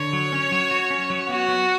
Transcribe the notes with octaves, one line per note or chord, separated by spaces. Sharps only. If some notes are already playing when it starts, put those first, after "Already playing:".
Already playing: D3 C#5
F#3
C#4
F#3
F#4
C#4
F#3
B3 F#4
B3